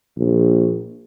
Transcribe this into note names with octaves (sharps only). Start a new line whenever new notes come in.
A#1